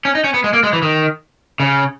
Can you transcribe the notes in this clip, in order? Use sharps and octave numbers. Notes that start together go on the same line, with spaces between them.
C#4
D#4
C#4
B3
G#3
A#3
G#3
E3
D#3
C#3